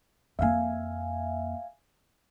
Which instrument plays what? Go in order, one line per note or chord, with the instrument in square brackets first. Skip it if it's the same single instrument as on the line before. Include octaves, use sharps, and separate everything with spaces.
[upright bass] F2 A#3 [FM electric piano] E5 F5 G#5